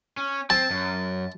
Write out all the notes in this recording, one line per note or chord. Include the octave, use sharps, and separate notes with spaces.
C#4
C4 A5
F#2